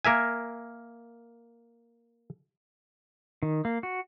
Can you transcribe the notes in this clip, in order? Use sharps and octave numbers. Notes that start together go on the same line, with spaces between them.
A#3 A#4 E5 G#5
D#3
A#3
F#4